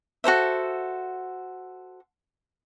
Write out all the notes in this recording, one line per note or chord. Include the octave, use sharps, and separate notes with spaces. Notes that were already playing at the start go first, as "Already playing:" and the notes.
F#4 A4 C5 E5